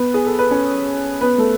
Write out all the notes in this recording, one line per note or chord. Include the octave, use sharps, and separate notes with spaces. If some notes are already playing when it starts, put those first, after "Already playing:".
Already playing: B3 B4
G#4
A4
B4
C#4 C#5
B3 B4
A3 A4